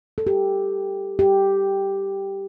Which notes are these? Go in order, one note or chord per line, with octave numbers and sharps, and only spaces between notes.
A4
G4
G4